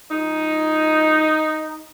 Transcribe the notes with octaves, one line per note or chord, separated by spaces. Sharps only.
G#2 F3 G#3 D#4